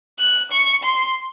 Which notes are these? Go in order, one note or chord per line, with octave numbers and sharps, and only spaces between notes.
F#6
C#6
C6